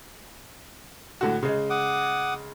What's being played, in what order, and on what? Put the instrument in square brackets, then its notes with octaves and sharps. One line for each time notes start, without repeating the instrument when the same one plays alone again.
[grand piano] A2 D3 F#4
C#3 G#3
[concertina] F#5 D6 D#6